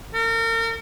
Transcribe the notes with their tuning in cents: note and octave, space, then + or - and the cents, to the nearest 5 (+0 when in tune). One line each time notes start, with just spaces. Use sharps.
A#4 -40